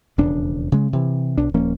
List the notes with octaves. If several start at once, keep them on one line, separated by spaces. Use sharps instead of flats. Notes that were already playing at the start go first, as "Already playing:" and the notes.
E1 F2 C#3 D4
C#3 G#3
C3 E3
B1 D4
D#1 F3 A#3 C#4